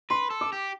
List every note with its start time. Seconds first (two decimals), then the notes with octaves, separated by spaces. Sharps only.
0.10 B4 C6
0.30 A4
0.41 D6
0.52 G4